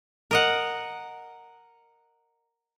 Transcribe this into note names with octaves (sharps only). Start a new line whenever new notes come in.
A#4 D#5 F#5